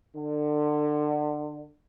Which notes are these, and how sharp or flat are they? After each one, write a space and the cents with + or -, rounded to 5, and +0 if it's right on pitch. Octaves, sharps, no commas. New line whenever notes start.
D3 +25